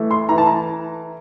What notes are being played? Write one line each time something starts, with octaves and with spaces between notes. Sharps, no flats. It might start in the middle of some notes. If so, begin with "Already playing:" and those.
Already playing: E3 A3
C6
E3 A#5
A5
A#5